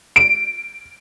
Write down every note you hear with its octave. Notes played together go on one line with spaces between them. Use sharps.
D7